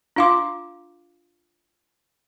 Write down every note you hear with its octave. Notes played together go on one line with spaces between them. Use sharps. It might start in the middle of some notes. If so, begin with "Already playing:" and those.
D4 F4 F5 C6 D6